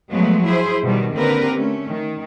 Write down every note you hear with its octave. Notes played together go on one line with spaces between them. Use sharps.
F3 F#3 G#3 A3 B3
E4 G#4 C5
B2 D#3 G3
D3 A#3 C4 G4 A#4 B4
A3 C#4
D#3